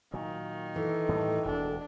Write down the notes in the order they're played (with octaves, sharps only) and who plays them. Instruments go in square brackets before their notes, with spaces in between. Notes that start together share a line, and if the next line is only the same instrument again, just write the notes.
[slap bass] A#2 F#3 [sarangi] D#3
[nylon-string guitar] E3 [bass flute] A4
[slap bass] A2 G3
[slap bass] E1 D2 [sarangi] D4